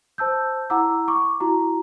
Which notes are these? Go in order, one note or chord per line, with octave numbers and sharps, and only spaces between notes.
C5 A5 E6 G6
E4 F#5 A#5 D6 E6
C#6 D6
E4 F#4 A#5